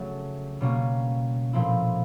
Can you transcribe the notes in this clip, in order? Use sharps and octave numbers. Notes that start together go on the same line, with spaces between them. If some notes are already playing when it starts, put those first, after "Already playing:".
Already playing: C#3 F#3 A3
B2 G3 A#3 C#4
A#2 F3 A3 C4 E4